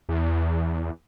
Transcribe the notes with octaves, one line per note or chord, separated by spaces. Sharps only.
E2